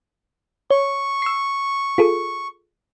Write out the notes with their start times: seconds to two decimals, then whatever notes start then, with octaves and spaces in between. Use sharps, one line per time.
0.70 C#5 C#6
1.22 E6 C7
1.98 F4 G#4 A4